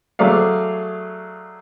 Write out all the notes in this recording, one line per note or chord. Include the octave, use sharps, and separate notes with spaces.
F#3 A3 G#4 D5 F5